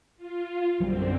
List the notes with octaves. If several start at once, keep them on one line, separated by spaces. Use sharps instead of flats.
F4
A#1 F#2 D3 F#3 G3 C4